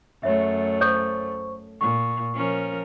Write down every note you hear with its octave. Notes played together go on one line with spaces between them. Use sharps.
F#2 A3 C#5 E5
A4 C5 C#5 C#6
A#2 C#6
F3 C#4 A#4